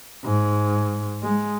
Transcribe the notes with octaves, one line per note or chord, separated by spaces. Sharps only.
G#2
G#3